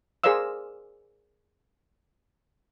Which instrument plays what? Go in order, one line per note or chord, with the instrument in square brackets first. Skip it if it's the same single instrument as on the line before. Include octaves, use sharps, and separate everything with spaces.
[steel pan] G#4 A#4 C5 D5 F5 E6